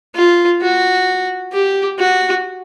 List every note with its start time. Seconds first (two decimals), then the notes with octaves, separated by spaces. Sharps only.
0.15 F4
0.61 F#4
1.52 G4
1.99 F#4